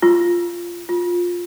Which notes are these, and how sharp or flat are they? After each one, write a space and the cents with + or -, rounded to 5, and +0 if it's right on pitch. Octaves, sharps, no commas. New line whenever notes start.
F4 -10
F4 +10